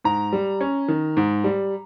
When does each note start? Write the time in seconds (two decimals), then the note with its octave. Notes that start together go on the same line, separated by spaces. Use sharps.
0.04 G#2 A#5
0.33 G3
0.61 C#4
0.88 D#3
1.17 G#2
1.44 G3